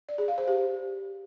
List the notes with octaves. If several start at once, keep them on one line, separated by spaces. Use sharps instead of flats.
D5
G#4
F5
C5
G4